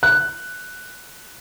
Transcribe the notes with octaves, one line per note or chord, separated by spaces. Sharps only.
F#6